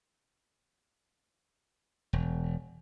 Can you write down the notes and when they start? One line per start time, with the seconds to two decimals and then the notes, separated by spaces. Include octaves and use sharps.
2.13 E1